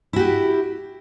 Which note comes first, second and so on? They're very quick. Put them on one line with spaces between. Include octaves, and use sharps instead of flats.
E4 F#4 G4